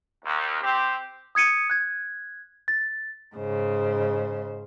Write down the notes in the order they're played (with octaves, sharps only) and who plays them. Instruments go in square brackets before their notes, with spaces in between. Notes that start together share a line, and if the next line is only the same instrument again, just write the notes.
[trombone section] D#2
C4 G4
[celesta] D#6 G#6 C#7 D#7
F#6 G#6
A6
[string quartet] G#2 C#3 C5